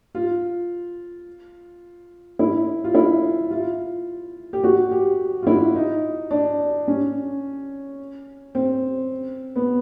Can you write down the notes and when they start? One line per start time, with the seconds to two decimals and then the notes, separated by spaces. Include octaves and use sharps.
0.15 F4
2.39 E4
2.84 F4
2.95 E4
3.51 F4
4.53 G4
4.64 F#4
4.91 G4
5.43 F4
5.47 E4
5.76 D#4
6.31 D4
6.88 C#4
8.55 C4
9.56 B3